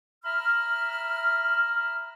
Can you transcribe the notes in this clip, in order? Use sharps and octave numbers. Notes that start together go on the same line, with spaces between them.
E5 A#5 B5 F6